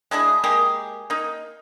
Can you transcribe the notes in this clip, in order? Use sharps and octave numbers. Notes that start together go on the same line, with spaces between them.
G#3 D4 E4 G#4
G#3 A#3 G4 G#4
A#3 D#4